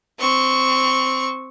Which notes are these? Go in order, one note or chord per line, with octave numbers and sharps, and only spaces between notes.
C4 C#6